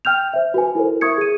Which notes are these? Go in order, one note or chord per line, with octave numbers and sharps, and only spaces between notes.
G5 F6 G6 F7
C5 E5
F#4 B4 G#5
E4 A4 A#4 C5
E5 C#6 D#6 G#6 C#7
G#4 D#7